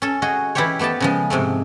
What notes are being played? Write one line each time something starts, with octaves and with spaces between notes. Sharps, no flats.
C#4 A4
F#4 G#4 D#5
E3 E4 F4 G4 C5 C#5
A3 B3 G4 D#5 A5
C#3 F3 G#3
G#2 C3 G#3 A3